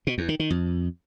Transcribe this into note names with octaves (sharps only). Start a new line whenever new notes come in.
B2
E2
D#3
D#3
F2